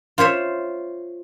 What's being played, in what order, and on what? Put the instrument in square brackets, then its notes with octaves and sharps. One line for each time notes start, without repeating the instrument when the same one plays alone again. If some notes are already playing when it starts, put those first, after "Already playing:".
[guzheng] F4 C5 C#5 E5